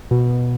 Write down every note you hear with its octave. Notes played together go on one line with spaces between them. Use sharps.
B2